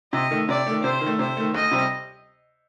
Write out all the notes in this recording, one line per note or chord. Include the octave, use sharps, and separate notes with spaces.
C3 D#5
D#3 A3
C3 D5
D#3 A3
C3 C5
D#3
A3
C3 C5
D#3 A3
D2 D#5
C3 G3 C4 G4